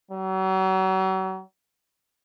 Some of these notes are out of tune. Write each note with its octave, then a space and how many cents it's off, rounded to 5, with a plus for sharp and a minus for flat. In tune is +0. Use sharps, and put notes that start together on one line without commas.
F#3 +40